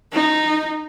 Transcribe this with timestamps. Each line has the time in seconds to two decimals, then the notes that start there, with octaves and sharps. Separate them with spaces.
0.13 D#4